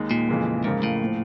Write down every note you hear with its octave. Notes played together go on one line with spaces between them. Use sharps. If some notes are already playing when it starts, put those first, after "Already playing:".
Already playing: D#2 D#3 G#3
A#2
F2 C#3 E3 G#3
C#2 G#2 C#3 F3 A#3
A2
A#2 F3